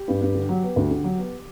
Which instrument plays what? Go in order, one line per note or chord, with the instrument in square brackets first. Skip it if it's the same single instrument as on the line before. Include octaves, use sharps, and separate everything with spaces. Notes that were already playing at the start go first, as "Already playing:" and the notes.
Already playing: [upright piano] G4
G2
G2
D3
F#3
B3
D2
D3
F#3
B3